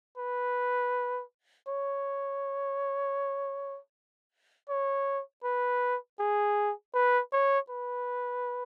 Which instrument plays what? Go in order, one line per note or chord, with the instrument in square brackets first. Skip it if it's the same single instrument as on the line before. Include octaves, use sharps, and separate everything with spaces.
[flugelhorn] B4
C#5
C#5
B4
G#4
B4
C#5
B4